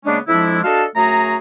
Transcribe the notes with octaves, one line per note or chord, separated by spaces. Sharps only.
C#3 G#3 A#3 B3 C#4 D4
F2 F3 G#3 D4 E4
D4 F#4 A4 D#5 F5 A5
F#2 A3 F#4 G#4 A#5